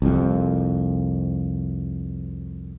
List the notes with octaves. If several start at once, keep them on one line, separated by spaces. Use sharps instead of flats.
C2 F2